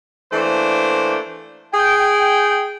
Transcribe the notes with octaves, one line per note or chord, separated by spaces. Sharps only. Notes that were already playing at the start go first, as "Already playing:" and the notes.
E3 A3 A#3 D4 C5
G#4 G5